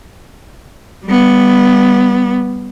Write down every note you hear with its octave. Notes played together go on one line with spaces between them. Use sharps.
G3 B3